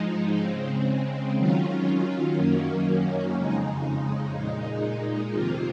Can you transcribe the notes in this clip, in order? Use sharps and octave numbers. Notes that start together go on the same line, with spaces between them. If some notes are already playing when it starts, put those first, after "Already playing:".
Already playing: G#2 F3 G#3 D#4
C#3 G#3 C4
D#3 F#3 C#4 F4
F#2 D#3 F#3 A#3 C#4
F2 C#3 G#3 D#4
A#2 G#3 D#4
F2 C3 D#3 A#3 F4